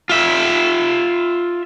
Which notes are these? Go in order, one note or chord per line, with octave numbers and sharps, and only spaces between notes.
F4 E5